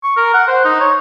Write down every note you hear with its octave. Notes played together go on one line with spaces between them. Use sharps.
C#6
A#4
F#5
C5
D#4
C#5